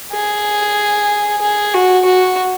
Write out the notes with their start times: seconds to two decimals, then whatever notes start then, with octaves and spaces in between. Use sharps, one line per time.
0.13 G#4
1.42 G#4
1.74 F#4
2.05 F#4